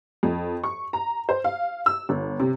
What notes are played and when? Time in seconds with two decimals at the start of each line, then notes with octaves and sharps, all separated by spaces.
0.23 F2
0.64 C#6
0.93 A#5
1.29 C5
1.44 F5
1.86 E6
2.09 G1
2.40 C3